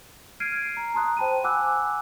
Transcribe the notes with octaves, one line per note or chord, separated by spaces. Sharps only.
F6 G#6 C7 D7 D#7
A#5
A5 A#5 C6 D#6 F#6
C5 G5 A5 B5 D#7
F#5 G#5 B5 D6 E6 F#6